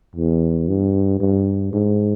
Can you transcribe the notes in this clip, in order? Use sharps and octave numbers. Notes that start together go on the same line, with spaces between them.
E2
G2
G2
G#2